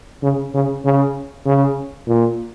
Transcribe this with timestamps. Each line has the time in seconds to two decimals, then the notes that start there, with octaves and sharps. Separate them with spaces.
0.23 C#3
0.54 C#3
0.85 C#3
1.46 C#3
2.07 A#2